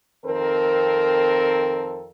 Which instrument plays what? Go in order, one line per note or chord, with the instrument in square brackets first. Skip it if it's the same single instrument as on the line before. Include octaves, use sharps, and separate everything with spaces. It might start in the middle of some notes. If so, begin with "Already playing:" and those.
[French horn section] F2 D#3 C4 A4 A#4